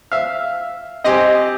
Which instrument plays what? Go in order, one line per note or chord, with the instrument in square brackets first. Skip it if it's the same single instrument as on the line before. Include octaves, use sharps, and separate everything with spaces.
[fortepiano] E5 F5
[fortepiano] C4 G4 G#5 [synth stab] D#5